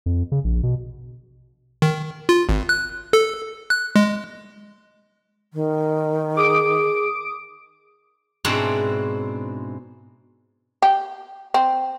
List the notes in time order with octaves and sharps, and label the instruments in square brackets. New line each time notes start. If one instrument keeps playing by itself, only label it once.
[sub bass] F2
C#3
A#1
B2
[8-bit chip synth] D#3
F4
G#1
F#6
A4
F#6
G#3
[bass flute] D#3
[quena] G#4 [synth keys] D6 D#6 D7
[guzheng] G#2 B2 C4 D4 E4
[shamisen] G4
C4